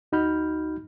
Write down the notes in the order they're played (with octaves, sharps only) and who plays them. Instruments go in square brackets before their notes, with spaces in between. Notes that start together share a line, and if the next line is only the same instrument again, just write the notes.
[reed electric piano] D2 D#4 F#4 B5 F6 G6